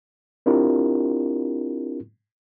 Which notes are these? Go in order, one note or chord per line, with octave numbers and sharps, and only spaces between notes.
C4 D4 E4 F4 G4 A#4